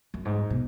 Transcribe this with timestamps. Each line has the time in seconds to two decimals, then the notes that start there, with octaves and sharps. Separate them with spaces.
0.14 F#2
0.25 G#2
0.50 B2